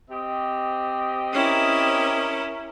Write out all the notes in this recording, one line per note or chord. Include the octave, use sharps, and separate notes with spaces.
C4 G4 D#5
C#4 E4 A#4